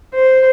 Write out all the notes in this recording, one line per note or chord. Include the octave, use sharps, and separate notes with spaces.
C5